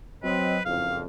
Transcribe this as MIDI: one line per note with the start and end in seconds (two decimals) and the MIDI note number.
0.23 0.58 54
0.23 0.58 60
0.23 0.64 71
0.23 0.58 75
0.65 1.06 30
0.65 1.06 41
0.65 0.98 77